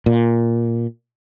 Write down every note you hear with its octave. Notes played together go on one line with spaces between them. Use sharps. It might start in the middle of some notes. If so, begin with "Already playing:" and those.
A#2